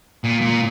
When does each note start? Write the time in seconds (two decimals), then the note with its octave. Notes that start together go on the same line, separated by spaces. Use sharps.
0.24 A#2
0.41 A#2